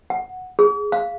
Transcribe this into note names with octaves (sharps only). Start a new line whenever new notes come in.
F#5
G#4
F5